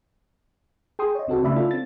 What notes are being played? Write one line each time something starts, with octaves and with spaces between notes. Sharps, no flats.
G#4 G5 C6 D#6
C#5 D#5
C#2 C4 F#4 A4
C#3 A3 D5 E5 B5
E4 F4 A4 E5
C4 A6